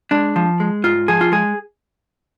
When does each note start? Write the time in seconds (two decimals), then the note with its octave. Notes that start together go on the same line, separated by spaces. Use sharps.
0.11 G#3 D4
0.36 F3
0.60 G#3
0.84 G#2 F4
1.08 F3 G#4
1.21 F4
1.32 G#3 G#4